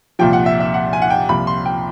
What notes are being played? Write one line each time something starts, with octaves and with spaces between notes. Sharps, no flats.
C2 A#2 F3 G5
F#5
E5
E5
F#5
G#5
F#5
G5
C2 A#2 F3 B5
C6
G5